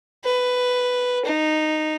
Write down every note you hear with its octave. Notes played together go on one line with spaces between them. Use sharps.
B4
D#4